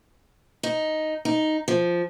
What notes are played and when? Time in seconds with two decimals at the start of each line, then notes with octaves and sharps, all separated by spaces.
0.63 D#4
1.25 D#4
1.68 F3